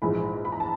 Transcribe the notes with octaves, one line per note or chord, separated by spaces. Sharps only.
A#1 G#2 E3 G#3 B5
B5
A#5
A5